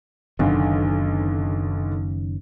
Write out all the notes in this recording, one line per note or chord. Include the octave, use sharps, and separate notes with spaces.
F#1 B1 F#2 D3 D#3